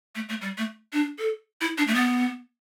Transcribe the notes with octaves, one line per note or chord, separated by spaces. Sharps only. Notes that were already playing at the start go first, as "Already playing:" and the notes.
A3
A3
G3
A3
D4
A4
E4
D4
A3
B3